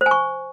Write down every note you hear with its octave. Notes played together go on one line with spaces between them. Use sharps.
C5
G#5
C#6